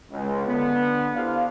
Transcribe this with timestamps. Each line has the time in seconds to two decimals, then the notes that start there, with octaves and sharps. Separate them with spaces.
0.11 C#2
0.47 D3 B3
1.15 E4 G4 A4 C5 D5 F5